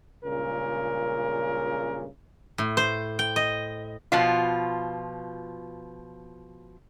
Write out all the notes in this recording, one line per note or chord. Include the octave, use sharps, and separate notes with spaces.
C#2 G2 A#2 C#3 A#4
A2
C5
G5
D#5
B2 F3 F4